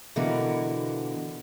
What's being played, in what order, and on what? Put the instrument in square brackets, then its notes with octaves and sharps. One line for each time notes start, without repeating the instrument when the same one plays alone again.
[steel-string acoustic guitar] B2 D3 E3 A#3 F#4 A#4